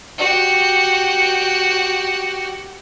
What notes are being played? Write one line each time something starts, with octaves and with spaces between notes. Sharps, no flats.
F#4 G4